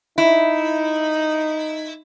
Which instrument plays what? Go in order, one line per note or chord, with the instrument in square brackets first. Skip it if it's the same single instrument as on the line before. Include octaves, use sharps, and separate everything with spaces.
[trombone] D#4 [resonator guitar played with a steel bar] E4